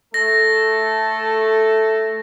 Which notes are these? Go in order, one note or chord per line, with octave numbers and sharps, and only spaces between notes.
A3 A4 A#6